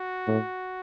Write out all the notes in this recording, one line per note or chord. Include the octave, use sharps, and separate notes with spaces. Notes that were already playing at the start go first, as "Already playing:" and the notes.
Already playing: F#4
A2